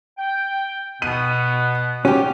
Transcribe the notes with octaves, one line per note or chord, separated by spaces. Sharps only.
G5
B2 B3 D#7
C#4 F#4 G4